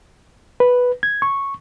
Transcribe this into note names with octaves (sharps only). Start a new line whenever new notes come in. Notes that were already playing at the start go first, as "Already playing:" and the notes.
B4
G#6
C#6